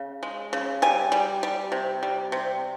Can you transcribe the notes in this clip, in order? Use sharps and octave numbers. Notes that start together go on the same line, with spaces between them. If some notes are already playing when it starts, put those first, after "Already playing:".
Already playing: C#3
G#3
C#3
G3 G#5
G3
G3
C3
G3
C3